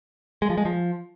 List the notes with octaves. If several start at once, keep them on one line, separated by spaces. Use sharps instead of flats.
G#3
F3
G#3
F3